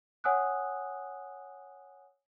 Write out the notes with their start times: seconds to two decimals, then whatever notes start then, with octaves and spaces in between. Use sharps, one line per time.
0.24 C#5 F#5 G#5 D#6 E6 F#6